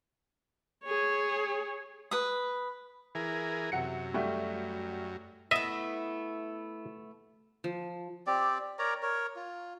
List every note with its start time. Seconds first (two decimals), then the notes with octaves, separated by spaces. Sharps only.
0.84 G#4 C#5
2.11 B4 D#6
3.15 E3 G#4 A#4
3.72 F#2 C3 F#5 C#7
4.14 G3 A3 F#4
5.51 A3 B3 E4 D#5 E5
7.64 F3
8.27 C4 G4 D5
8.79 A#4 C#5 D5 A#5
9.02 A#4 C#5
9.36 F4